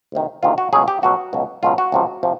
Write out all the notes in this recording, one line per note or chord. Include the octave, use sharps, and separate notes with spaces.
D2 C3 D#3
D2 C3 D#3 F4
F#4
C#2 B2 F#3 G#4
G4
C#2 B2 F#3 F#4
C#2 B2 F#3
C#2 B2 F#3 F4
F#4
C#2 C3 F3
C3 F3